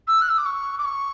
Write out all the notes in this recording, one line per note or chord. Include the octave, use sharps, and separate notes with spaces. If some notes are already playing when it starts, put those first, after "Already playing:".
E6
F#6
E6
D6
C#6
D6
C#6